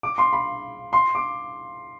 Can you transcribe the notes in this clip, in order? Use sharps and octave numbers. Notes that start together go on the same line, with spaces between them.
D6
C6
B5
C6
D6